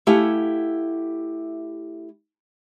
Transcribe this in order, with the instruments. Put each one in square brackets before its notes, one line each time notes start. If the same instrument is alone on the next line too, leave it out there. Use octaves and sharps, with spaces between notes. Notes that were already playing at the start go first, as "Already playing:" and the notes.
[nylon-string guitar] A3 E4 G4 F5 F#5 G#5